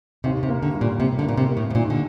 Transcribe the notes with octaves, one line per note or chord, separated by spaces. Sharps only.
D#2 C3
C3
A#3
D3
G3
A#2
C3 A#3
D3
A#2 A#3
C3
A#3
A2
A2
A#2 D#3
D3